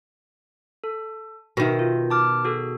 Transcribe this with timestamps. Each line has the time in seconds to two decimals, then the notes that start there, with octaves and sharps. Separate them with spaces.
0.84 A4
1.57 B2 D#3 A#4 E5
1.79 F4
2.10 A5 D6 F6
2.45 F#4 G#4 A4